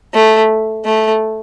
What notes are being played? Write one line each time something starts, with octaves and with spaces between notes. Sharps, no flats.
A3
A3